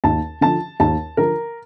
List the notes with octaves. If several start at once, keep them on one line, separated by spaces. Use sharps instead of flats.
D#2 A5
D3 F3 A5
D#2 A5
D3 F3 A#4